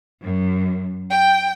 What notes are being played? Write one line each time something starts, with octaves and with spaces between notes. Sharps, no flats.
F#2
G5